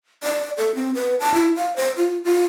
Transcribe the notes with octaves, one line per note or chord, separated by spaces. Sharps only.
D5
A4
C4
B4
A5
E4
F5
C5
F4
F4